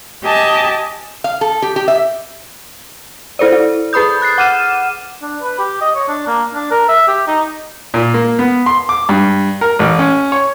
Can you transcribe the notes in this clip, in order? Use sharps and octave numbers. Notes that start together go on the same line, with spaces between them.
G4 D#5 G#5 A5
F5
A4
G4
G4
E5
E4 A4 C5 D5
E4
G#4 B4 B5 D#6 G6
F#6 A6 C7
F#5 D6 F6 D#7 E7
D4
B4
G4
D#5
C#5
D4
A#3
D4
A#4
E5
G4
D#4
A#2
A#3
B3
C6
D6
G2
A#4
A1
C#4
C#5